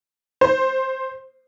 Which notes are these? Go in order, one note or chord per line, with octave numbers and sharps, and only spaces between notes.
C5